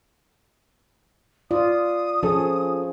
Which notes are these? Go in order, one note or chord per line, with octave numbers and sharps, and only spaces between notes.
F4 D5 D#6
F3 C#4 G#4 A4 C#5